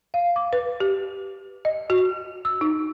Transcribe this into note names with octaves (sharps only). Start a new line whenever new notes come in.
F5
D6
B4
G4
D#5
F#4
E6
D#4